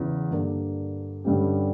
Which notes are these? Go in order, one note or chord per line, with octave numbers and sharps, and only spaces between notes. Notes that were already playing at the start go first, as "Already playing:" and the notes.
Already playing: E2 C#3 E3
G2 D3 A#3
G2 D3 G3 C#4 G4